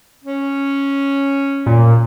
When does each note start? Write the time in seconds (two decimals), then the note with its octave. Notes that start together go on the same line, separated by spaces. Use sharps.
0.24 C#4
1.66 A#2